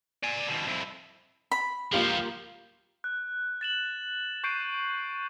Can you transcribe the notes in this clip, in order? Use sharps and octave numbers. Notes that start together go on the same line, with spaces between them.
D5 G#5
D#2 B2
F2 E4
B5
C#2 F3 A#3 F4 G4
F#6
A6 E7 F#7
C#6 G6 C7 D7 D#7